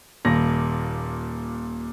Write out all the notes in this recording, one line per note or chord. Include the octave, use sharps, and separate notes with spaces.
D#1 A#2 A#6